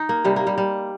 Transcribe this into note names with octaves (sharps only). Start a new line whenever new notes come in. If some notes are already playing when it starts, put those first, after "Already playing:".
Already playing: D#4
A#3
C3 G3
A#3
G3
G3